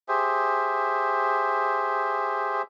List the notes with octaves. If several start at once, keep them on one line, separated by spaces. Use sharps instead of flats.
G4 G#4 C5 E5